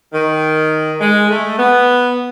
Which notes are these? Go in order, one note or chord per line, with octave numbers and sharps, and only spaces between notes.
D#3
G#3
A3
B3